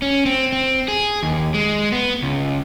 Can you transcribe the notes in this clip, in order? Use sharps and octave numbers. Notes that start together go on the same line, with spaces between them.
C#4
C4
C4
G#4
D#2
G#3
B3
C#2